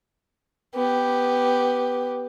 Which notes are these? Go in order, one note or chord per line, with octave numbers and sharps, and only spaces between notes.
B3 G4